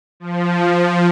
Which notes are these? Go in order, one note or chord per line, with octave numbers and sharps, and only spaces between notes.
F3